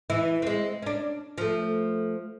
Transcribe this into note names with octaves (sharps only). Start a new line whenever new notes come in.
E3 E4
G#3 C4
C#4 D4
F3 A3